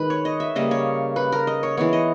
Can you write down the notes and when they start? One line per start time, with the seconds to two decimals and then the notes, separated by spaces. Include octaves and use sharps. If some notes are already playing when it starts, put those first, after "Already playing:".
Already playing: D#3 G#3 B4
0.10 C#5
0.25 D#5
0.40 E5
0.55 C#3 G3 A#3 D#5
0.71 C#5
1.16 B4
1.32 A#4
1.47 D#5
1.63 C#5
1.77 E3 G#3 B3 C#5
1.93 D#5